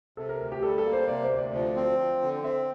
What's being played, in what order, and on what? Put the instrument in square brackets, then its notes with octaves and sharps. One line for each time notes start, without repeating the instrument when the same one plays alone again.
[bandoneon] C3 [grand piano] A4
[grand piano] A#4
[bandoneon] D2
[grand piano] G4
[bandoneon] G3 [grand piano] A4
[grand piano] A4
[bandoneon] A#3
[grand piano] C5
[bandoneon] C3 [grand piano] D5
[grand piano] C5
[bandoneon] D2
[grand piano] D5
[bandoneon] F3
C4
F3
D3
[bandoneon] C4 [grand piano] E5